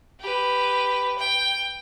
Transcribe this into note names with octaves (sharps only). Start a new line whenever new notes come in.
G4 B4
G5